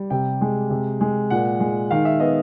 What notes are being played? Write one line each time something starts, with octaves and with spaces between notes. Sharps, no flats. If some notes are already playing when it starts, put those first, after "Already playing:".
Already playing: G3
C3 G5
G#3
C3
G#3
A#2 F#5
G#3
D#3 F5
E5
B3 D#5